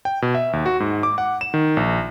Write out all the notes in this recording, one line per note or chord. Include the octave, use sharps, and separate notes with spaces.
G5
B2
E5
D#2
F#4
G#2
D6
F#5
E7
D#3
A#1